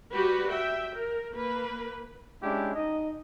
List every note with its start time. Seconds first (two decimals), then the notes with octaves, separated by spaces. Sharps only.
0.12 G3 F#4 G4 B4
0.53 E5 G5
0.95 A#4
1.31 A#3 B4
2.43 G#3 C#4 D4 E4 G4
2.75 D#4 D#5